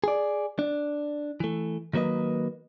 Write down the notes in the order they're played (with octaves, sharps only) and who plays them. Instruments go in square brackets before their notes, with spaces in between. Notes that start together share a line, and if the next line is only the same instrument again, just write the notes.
[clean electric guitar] G#4 D5
D4
E3 A3
D#3 F#3 A#3 B4 D#5